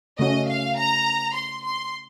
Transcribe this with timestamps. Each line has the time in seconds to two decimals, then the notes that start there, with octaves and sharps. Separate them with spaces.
0.19 C#3 A3 C#4 F#4 D#5
0.48 F5
0.77 A#5
1.35 C6
1.65 C6